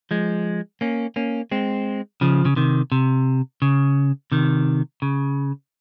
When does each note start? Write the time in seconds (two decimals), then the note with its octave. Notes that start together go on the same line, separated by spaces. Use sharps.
0.11 F3 G#3
0.81 A#3 C#4
1.16 A#3 C#4
1.51 G#3 C4
2.21 C#3 F3
2.45 C#3
2.56 C3 D#3
2.92 C3
3.62 C#3
4.32 C3 D#3
5.02 C#3